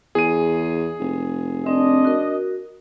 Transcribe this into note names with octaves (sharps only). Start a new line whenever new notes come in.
E2 G#4 D#7
F1
C4 D4 D#5
F#4 A#4